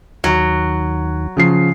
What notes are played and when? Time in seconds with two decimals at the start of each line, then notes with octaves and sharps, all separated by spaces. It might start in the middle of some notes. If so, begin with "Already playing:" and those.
0.24 D#2 D#3 F#3
1.37 C#3 F3 C7